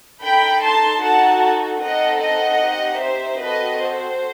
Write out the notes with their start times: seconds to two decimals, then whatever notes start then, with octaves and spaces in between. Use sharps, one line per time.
0.23 D#4 A4 G5 B5
0.62 A5 C6
1.02 D#4 F#4 A4 F#5 A5
1.81 C4 D#4 A4 D#5 F#5
2.20 D#5 F#5
2.61 C4 D#4 G4
3.00 C5 E5
3.39 C4 F#4 A4 B4 D#5
3.80 C5